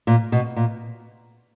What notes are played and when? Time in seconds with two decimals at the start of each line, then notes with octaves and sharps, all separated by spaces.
0.07 A#2
0.32 B2
0.56 A#2